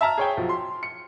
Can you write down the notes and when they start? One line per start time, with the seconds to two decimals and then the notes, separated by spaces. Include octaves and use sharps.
0.01 E5 A5 A#5 F6
0.18 G#4 C#5 G5
0.37 B1 F3
0.49 C6
0.83 C#7